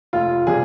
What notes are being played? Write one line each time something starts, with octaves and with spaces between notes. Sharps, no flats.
F1 F4
C3 G3 G#4